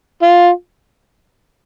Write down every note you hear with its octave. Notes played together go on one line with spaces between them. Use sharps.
F4